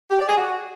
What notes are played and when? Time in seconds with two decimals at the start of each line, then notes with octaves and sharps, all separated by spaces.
0.10 G4
0.19 D5
0.28 G#4
0.36 F#4